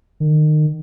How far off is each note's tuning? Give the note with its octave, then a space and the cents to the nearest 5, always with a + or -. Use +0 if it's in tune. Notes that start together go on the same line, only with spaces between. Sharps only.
D#3 -30